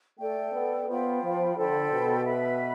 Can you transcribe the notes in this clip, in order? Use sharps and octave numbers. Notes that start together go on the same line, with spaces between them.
A3 A4 D5 G5
B3
B3 F4 C5 G5 B5
F3
D3 A4 C5 G5 B5
B2
B4 E5 B5